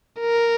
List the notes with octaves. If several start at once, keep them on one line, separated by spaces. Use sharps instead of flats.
A#4